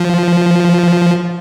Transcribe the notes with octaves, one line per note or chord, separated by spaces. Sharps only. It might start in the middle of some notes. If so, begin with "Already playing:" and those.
Already playing: F3